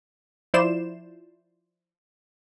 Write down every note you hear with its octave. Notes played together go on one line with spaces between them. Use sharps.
F3 E4 C5 D5 C6 E7